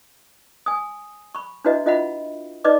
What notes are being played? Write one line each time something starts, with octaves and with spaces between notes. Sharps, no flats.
G#5 D#6
B5 C#6
D4 E4 F#4 B4 D#5 E5
D4 F4 D#5 E5 F#5 B5
D#4 B4 D5 D#5 D6